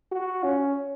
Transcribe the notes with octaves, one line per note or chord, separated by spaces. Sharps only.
F#4
C#4